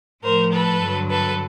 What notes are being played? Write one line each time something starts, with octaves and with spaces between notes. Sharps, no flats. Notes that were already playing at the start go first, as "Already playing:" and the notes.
A2 F3 A#4 C5
A4 B4
G2 D3 F#3
A4 B4